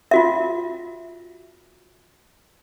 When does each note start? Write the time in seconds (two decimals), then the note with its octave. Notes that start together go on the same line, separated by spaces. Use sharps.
0.11 F4 F#4 E5